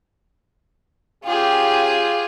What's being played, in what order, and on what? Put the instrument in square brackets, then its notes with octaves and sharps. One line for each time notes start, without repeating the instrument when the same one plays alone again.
[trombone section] C#3 G4 [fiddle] F4 G#4